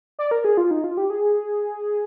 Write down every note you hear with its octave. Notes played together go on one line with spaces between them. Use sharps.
D5
A#4
G#4
F4
D#4
F4
G4
G#4